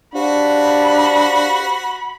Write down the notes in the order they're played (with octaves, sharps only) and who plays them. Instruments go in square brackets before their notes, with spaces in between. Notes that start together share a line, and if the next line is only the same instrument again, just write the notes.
[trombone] D4 [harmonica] F#4 [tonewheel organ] G4 C5 F5 [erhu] B5